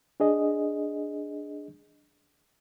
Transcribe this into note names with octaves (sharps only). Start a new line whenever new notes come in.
D4 G#4 D#5